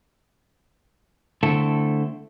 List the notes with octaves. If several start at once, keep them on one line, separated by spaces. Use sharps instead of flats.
D3 A3 C4 E4 A4